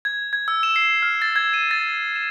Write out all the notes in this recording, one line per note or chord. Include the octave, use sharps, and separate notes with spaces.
G#6
G#6
E6
E7
C7
F6
A6
G#6
D#7
A6
E7